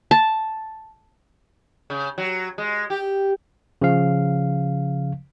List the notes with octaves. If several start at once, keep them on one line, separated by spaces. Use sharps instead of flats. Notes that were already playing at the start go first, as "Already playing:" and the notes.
A5
C#3
F#3
G#3
G4
C#3 F3 F5